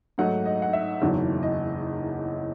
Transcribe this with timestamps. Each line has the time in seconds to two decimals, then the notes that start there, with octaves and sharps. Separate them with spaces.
0.18 G#2 F#3 A3 D#4 F#5
0.46 D#5
0.62 F#5
0.73 E5
1.02 F#1 E2 D#3 F#3
1.43 D#5